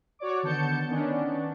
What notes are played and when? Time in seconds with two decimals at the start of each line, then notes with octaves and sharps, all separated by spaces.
0.19 F#4 C#5 D5 D6
0.43 D3 D#3 B3 A5 G6 C#7
0.87 D#3 B3 C#4 D4